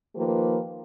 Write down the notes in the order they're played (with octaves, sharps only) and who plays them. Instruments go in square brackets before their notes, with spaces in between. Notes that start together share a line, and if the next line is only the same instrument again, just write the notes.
[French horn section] D#3 F3 A#3 G4 B4